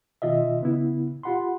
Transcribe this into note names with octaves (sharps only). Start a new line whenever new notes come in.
B2 D#3 F4 D#5 E5
C#3 B3 E4
F4 G4 F#5 B5 C6